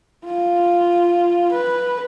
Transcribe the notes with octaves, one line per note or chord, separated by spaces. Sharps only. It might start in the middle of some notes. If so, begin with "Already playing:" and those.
F4
B4